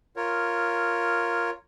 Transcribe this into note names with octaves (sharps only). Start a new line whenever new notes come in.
F4 A#4 C#5